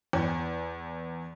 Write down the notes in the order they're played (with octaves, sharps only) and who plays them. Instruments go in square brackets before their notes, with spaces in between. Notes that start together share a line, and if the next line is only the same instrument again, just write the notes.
[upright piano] E2